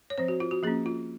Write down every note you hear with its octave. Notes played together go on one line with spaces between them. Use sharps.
C#5
F3 C4 C5
F#4
F4
F#4
F3 A#3 C#4 G#4
F4